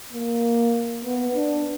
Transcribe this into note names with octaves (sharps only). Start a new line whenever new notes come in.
A#3
B3
D4